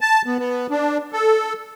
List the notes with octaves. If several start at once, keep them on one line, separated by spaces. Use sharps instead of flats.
A5
B3
B3
D4
A4